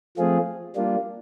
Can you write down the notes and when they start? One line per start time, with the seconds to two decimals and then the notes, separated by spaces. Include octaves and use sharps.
0.17 F3 A3 C4 F4 G#4
0.76 G3 A#3 D4 F4